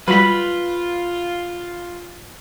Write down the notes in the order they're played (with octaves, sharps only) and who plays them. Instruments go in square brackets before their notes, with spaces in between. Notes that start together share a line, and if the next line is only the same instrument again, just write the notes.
[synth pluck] F#3 G3 [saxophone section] F4 [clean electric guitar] B4 B5